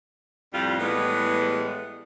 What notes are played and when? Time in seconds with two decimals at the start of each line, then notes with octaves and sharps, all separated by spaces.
0.54 F2 A2 G3 F4
0.80 A2 E3 G3 G#3 B3